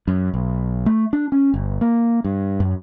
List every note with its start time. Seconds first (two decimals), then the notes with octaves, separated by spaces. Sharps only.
0.08 F#2
0.34 B1
0.86 A3
1.13 D4
1.32 C#4
1.54 G1
1.81 A#3
2.24 G2
2.60 F#2